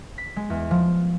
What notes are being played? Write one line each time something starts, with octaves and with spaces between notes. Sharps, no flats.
B6
G#3
E2
F3